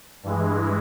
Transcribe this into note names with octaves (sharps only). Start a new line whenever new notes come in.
G2 E3 G#3